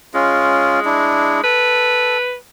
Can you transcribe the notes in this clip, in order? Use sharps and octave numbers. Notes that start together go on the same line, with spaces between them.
G#3 C#4 F4
D4 E4
A4 B4